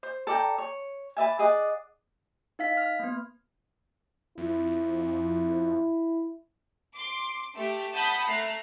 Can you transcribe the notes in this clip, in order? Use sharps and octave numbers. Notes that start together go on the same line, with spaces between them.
C5
A4 D5 G5 A#5
C#5
B4 D5 E5 G#5
G#4 D5 D#5 F#5
D#4 F5 B6
F6
A#3 B3
F2 E4
C6 D6
A3 G4
F#5 A5 B5 D#6 G6
A3 A#5 F#6 C7